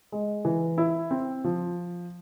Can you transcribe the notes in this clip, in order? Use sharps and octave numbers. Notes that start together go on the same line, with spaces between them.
G#3
E3
E4
C4
F3